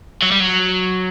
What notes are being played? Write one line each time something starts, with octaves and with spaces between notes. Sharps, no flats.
F#3
G3
F#3